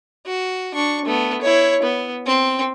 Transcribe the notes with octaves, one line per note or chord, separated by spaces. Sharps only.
F#4
D4 C#6
A3 B3
E4 C#5
B3
C4